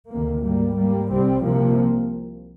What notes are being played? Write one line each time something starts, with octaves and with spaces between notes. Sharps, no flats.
D2 C3 D#3 A#3
G#2 G3 A#3
G#2 G3 A#3
C2 C3 G3 C4
C2 C3 F3 A#3